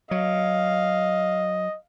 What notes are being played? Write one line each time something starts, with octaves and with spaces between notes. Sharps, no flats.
F#3 D#5 F5